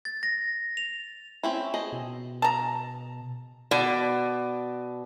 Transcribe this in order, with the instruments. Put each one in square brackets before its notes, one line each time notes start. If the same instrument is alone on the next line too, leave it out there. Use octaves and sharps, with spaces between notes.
[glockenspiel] A6
A#6
F7
[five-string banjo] C4 C#4 E4
G#4 A4 D#5
[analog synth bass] B2
[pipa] A5 A#5
[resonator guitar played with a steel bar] B2 D5